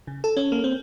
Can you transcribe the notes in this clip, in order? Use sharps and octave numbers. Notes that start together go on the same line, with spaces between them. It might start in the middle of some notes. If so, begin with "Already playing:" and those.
C#3
A4
C#4
A#3
C4